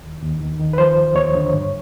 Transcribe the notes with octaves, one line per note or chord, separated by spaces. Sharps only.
D#2
D#2
D#3
D#3
B4
F3 C5
D#2
D#2 C#5
D3
G2